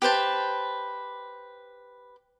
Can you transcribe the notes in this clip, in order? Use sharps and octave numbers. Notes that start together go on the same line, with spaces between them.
G4 B4 C5 A5